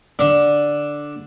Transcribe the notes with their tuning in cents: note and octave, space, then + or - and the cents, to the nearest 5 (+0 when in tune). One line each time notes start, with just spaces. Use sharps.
D3 +0 D4 +0